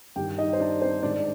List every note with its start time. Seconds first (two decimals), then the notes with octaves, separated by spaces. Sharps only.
0.16 G2 D#3 G4 G5
0.38 D#4 D#5
0.53 C5
0.60 D4 D5
0.82 C4 C5
1.03 G#2 D#3 D4 D5